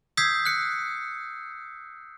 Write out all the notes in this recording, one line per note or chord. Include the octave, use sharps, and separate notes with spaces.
D#6 E6 G6 G#6 B6 C7
F#6 C#7